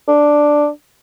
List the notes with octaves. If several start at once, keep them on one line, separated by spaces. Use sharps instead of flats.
D4